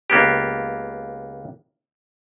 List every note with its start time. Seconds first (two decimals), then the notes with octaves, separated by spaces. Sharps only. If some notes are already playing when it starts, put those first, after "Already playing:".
0.10 C#2 A#3 B3 G4